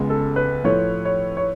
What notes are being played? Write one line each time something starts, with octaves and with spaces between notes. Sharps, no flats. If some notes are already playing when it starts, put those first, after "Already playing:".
Already playing: C#2 C#3 G#3 B3
A4
B4
A2 F3 A3 C#5
C#5
C#5